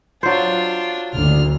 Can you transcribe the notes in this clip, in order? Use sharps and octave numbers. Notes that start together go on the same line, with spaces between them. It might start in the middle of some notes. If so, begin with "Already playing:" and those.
F#3 D4 F4 C5
F#1 D2 D3 F6